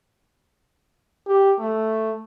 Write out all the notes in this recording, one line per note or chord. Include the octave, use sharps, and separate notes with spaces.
G4
A3